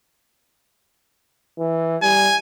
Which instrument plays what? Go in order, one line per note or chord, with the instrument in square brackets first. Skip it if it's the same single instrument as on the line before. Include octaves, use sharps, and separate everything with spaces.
[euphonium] E3
[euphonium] G3 [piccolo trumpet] G#5